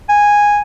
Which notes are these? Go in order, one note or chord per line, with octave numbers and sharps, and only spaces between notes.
G#5